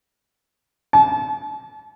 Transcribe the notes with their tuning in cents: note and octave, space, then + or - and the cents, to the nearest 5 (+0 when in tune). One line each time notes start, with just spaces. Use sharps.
A5 -40